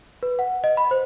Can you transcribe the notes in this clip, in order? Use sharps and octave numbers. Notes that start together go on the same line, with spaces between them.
B4
F#5
D#5
B5
C5